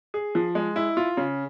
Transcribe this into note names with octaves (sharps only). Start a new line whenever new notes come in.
G#4
F3
G#3
E4
F4
C#3